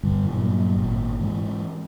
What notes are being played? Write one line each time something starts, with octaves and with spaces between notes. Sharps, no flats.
G2 D3 G3
G2 A#2 F#3
G#1 A#2
G#2 E3 G#3